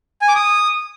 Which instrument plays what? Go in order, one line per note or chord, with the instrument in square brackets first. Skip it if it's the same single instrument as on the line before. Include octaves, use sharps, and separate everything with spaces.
[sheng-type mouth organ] G#5
D6
D#6